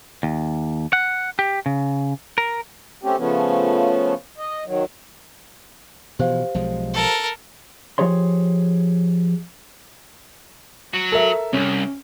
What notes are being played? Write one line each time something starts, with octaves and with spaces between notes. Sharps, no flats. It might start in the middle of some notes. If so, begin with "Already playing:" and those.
D#2
F#5
G4
C#3
A#4
A3 C4 C#4 G4
C#3 F3 A3 B3 C#4
D#5
D#3 F#3
B2 E3 F3 G4 C5 F5
B1 F3 G#3
A4 A#4
F3 G4 G#4 C#5 C6
F#3 F#4
A4 A#4 E5
C2 C#4